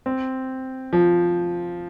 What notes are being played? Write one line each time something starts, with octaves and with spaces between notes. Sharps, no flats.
C4
F3